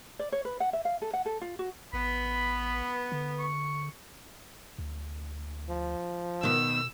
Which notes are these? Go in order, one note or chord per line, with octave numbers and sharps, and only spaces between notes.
D5
C#5
B4
F#5
E5
F5
A4
F#5
A4
F4
F#4
A1 B3 B5
D3
C#6
D2
F3
B2 D#3 B3 E6